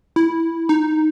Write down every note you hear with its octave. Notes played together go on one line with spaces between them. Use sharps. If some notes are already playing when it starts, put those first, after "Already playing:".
E4
D#4